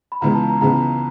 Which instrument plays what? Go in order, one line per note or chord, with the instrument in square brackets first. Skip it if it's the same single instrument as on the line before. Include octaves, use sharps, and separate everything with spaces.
[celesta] B5
[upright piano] C#2 C#3 E3 G#3 B3 [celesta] A#5
[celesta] A5
A#5
[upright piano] C#2 C#3 E3 G#3 B3 [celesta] A#5